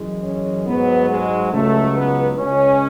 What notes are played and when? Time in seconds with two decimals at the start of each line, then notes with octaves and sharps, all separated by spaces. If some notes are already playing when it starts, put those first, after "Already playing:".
Already playing: F#2 E3 G#3
0.23 C#4
0.66 G#2 F#3 B3
1.09 G#3
1.52 C#2 C#3 F#3 A3
1.95 B3
2.38 C#2 C#3 G#3 C#4